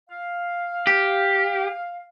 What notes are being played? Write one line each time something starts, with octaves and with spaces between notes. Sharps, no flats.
F5
G4